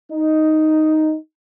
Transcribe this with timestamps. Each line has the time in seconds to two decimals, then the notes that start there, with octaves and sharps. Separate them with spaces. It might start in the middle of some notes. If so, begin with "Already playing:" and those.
0.11 D#4